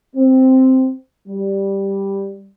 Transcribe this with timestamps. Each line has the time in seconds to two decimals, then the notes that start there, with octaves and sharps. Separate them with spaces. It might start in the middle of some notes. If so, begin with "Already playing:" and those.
0.16 C4
1.28 G3